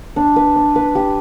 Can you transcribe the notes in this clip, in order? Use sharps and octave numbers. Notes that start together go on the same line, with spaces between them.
D4
B4
D4
B4
G4